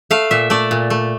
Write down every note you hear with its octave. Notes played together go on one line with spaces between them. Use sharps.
A3 F5
A#2 E5
A3 D5
A#2
A3